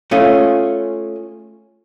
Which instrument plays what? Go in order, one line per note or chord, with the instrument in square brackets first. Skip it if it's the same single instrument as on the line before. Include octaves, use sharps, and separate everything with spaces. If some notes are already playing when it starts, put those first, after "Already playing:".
[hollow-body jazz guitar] A3 C#4 F4 G#4